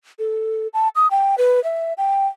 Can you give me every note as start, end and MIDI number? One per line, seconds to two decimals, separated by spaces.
0.19 0.67 69
0.73 0.88 81
0.95 1.07 87
1.11 1.35 79
1.38 1.62 71
1.64 1.93 76
1.97 2.27 79